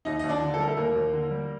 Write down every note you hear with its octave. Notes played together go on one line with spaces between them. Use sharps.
D#2 D#4 D#5
D#2 D#5
D4 D5
D3
A4
G3 A#4
A3 A4
D#2 A#3 A#4
D#2
D3
G3